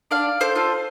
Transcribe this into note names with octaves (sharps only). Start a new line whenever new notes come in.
D4 D5 F5
A4 C5
F4 A4